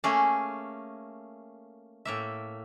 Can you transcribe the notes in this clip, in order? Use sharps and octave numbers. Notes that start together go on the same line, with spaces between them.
A3 A#3 C#4 G#4
A2 A#3 E5